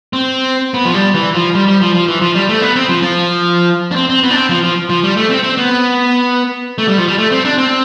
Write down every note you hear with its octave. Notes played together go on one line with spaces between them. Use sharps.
C4
B3
F3
G3
E3
F3
G3
G3
F3
F3
E3
F3
G3
A3
B3
C4
F3
F3
D4
C4
C4
B3
D4
C4
F3
F3
F3
G3
A3
C4
C4
B3
A3
G3
F3
G3
A3
C4
D4
C4